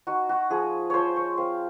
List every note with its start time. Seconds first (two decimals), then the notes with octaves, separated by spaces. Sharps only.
0.07 D#4 F#4
0.29 F#4
0.50 F3 G#4
0.90 F3 C5 C#5
1.16 C#5
1.37 C4 F5